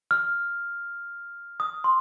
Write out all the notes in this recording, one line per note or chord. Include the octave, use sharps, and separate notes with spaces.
F6
D#6
C6